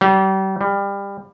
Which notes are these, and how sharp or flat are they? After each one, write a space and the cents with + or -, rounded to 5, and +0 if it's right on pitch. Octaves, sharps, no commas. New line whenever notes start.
G3 -35
G3 +25